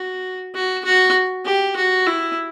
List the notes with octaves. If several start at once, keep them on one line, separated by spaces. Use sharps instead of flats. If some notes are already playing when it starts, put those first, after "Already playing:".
Already playing: F#4
F#4
F#4
G4
F#4
E4